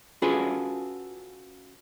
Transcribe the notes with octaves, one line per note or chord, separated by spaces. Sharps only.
C#4 F4 F#4 G#4 A4 B4